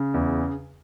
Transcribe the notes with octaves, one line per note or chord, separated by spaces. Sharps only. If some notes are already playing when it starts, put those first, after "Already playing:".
Already playing: C#3
E2